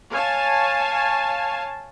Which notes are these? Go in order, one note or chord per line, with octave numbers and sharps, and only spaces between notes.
C#5 F5 G#5 A5